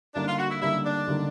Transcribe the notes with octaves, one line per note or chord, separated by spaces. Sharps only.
D3 G3 A#3 D4 D#4
F4
F#4
E4
D3 G3 A#3 D#4 E4
D4
D3 G3 A#3 D#4